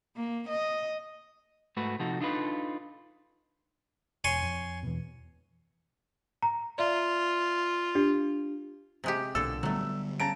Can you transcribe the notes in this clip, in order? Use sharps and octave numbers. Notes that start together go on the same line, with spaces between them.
A#3
D#5
G#2 A3 F#4 B4
C3 F3 D#4 F#4 A4
D4 D#4 F4 A4 B4
E1 C#5 G#5 C6
F2
E2 B2
A#5
F4 D5 E5
D4 G4
C3 G#3 G4
B1 A#2 D3 A4 E6
D3 F#3 G3 A3 B3
C#3 A5 A#5 D7